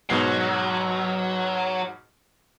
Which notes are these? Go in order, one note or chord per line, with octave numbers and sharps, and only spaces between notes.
G#2 B2 F#3 C7